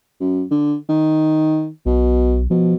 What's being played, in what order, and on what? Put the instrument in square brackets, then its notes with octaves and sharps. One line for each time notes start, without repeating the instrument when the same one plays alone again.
[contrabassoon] F#2
D3
D#3
[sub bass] B1 [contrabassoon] B2
[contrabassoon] B2 [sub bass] F3